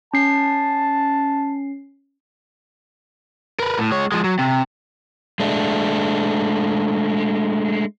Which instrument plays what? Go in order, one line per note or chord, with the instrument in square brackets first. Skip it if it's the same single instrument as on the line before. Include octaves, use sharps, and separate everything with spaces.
[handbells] C#4 C7 [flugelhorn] A5
[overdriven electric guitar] A#4 B4
A2
G#3 C#5
F3 G#3
F#3
C3
[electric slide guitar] G#3 A3 D4